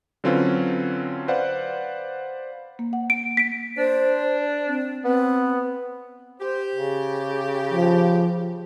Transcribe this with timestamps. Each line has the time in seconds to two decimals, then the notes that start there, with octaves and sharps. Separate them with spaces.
0.24 D3 F#3 C4 C#4 F4 B4
1.28 B4 C5 D5 F5 F#5
2.79 A#3
2.93 F#5
3.10 D7
3.37 B6 D7
3.78 D4 C5
4.68 C4
5.04 B3 C4
6.40 G4 C5
6.75 C#3
7.73 F3